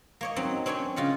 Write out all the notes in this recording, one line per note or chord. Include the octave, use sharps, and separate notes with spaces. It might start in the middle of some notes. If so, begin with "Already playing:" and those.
A#3 C#5 D#5
F#3 C4 D#4
C4 D4 C#5 G5 G#5
C#3 F4 D#5 F#5